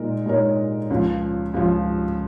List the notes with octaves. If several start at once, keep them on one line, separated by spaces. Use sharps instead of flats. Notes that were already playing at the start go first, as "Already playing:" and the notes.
Already playing: A#2 G#3 D#4 A#4
A#2 G#3 D#4 A#4 C#5
C#2 C#3 F3
C#2 C#3 F3